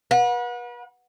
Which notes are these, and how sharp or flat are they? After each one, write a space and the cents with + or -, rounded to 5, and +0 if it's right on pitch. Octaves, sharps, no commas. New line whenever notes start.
B4 -35 F#5 -35